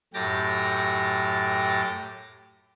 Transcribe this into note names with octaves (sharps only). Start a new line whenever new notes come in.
F#2 A2 G4 G5 A6 A#6